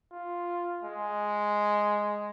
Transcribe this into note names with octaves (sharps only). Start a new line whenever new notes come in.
F4
G#3